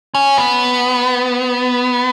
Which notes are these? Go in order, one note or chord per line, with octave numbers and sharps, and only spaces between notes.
C#4
B3